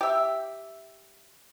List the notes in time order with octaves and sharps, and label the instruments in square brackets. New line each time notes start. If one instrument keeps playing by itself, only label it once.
[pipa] G4 E5